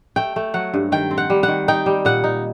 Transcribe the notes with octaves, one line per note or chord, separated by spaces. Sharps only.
A3 G5
A3
F#3 F#5
G2
D#3 G5
C4
F#5
G3
F#5
D#3
D#4 G5
G3
A#2 F#5
D#4